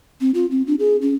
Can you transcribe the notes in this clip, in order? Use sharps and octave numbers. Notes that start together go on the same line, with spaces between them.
C4
F4
C4
D4
G#4
C#4